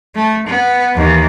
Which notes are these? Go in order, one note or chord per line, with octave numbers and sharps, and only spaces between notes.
A3
B3
D#2 E3